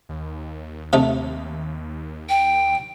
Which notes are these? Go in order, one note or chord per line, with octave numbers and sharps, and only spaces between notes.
D#2
C3 A3 D#4
G5